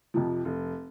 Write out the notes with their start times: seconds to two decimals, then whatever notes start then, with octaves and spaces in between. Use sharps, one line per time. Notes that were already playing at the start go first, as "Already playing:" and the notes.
0.14 F2 C3 F3
0.45 F1